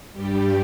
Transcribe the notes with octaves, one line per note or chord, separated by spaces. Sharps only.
G2 G3 G4